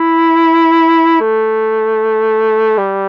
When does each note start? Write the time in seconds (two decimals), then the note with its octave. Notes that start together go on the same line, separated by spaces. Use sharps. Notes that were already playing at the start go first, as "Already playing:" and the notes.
Already playing: E4
1.21 A3
2.78 G3